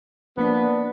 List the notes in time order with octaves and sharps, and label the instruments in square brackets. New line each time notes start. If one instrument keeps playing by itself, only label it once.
[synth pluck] F3 A#3 B6 [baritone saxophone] B3 [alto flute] D4